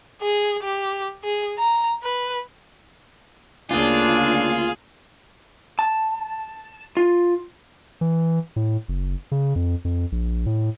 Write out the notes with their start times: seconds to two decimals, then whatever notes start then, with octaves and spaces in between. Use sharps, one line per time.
0.22 G#4
0.63 G4
1.24 G#4
1.58 A#5
2.03 B4
3.71 D2 C#3 A#3 D4 F4 G#4
5.79 A5
6.97 F4
8.01 E3
8.56 A2
8.88 F#1
9.32 C#3
9.56 F2
9.85 F2
10.12 A#1
10.46 A2